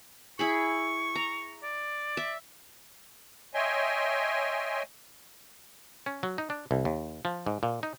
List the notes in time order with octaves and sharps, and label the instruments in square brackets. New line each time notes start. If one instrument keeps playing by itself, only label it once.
[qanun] E4 G#4 B5 [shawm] C#6
[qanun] A#5
[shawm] D5
[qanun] E5
[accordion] C#5 D#5 E5 G5 G#5 C6
[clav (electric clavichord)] C#4
F#3
D#4
D4
C2
D#2
F3
G#2
A#2
D#4